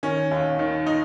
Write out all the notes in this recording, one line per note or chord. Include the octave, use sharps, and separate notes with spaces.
D#3 C#4
D#2
D#3
D#4